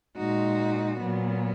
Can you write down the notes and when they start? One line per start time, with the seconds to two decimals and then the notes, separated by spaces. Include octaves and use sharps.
0.16 A#2 G#3 D#4 F#4
0.99 A#2 F#3 B3